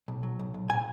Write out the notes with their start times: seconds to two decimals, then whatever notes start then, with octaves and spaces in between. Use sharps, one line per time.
0.08 B1
0.23 F#3
0.39 B1
0.54 B1
0.69 A#2 G#5